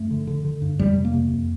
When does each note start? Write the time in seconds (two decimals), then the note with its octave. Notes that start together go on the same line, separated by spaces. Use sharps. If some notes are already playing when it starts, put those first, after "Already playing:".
Already playing: G2 A3
0.11 D3
0.27 D3
0.45 D3
0.62 G2
0.79 F2 G3
0.96 C3
1.05 A#3
1.13 C3
1.30 F2